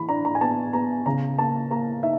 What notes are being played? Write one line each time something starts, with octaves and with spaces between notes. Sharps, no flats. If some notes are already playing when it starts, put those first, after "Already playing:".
Already playing: E3 B5
D4 A#5
A#5
G#5
B3 A5
B3 A#5
C#3 A#5
A#3 A5
A#3 A#5
D#4 E5